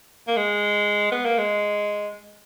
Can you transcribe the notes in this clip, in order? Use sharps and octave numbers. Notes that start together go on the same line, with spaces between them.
A#3
G#3
B3
A#3
G#3